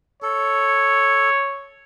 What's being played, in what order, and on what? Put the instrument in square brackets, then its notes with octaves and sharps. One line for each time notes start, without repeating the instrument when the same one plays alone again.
[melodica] A4 [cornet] C#5